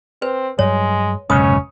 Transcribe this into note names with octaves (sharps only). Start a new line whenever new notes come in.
C4 B4
G2 F#3 G#3 C#5
F1 B1 G#2 C#3 C#4 D#6